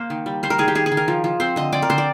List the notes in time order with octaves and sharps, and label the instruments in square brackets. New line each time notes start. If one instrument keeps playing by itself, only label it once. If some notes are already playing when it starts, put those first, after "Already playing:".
Already playing: [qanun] A#3 C5
D#3
G3
G3 C5
A#4
D#3 G#4
G4
D#3 G#4
G#4
D#3
A#4
F3
F3
C4 C5
D3 D#5
C4 D5
A#4
D3 C5
D5